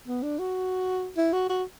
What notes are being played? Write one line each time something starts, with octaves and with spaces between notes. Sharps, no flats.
B3
D4
F#4
E4
F#4
F#4